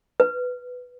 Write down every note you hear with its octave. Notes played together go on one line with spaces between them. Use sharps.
B4